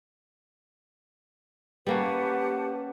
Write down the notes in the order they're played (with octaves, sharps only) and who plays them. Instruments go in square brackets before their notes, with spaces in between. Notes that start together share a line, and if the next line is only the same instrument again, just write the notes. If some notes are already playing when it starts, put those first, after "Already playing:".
[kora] G3 A#3 C#4 [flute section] G4 F#5 A5 [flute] B4